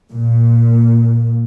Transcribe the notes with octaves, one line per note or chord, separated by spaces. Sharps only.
A#2